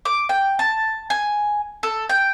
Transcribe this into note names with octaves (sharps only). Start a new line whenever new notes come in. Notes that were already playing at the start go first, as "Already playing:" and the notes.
D6
G5
A5
G#5
A4
G5